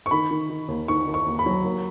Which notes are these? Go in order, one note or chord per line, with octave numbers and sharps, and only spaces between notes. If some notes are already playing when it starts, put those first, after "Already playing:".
C#6
D#3 B5
D#3
D#3
D#2
D#3 C#6
D#3
C#6
D#2
B5
F#3
D#2